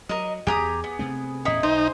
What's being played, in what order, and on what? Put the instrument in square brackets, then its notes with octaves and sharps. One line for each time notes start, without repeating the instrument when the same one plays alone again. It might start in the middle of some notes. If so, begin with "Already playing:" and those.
[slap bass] F#3 [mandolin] A#4 D#5
[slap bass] E2 [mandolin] G4 A#5 D#6 [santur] G#4
[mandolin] B3
[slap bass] C3 A3 C4
[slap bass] E2 A2 C#4 [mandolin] D#4 E4 [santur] D#6
[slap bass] B1 [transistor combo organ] D#4 [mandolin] C5